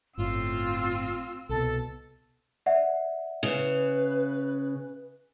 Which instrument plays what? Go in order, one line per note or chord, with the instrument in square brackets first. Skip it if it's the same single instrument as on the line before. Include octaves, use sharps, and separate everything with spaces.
[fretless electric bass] G1 A2 [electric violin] C4 E6 [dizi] F4
[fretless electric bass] C2 B2 [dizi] A4
[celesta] D5 E5 F#5
[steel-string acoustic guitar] C#3 [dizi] B4